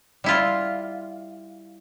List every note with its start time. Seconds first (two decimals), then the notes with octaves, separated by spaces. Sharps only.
0.24 G3 E4 F4